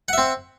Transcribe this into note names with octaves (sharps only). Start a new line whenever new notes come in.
C4 E5 F#5